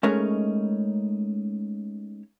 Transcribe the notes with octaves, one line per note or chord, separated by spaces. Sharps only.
G#3 A3 C#4 D#4 A#4 C#5